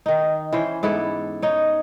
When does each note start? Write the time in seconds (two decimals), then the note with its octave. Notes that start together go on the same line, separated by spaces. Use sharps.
0.06 D#3 D#4
0.53 E3 C#4 C5
0.83 G#2 B3 E4 A4
1.42 D#4 C#5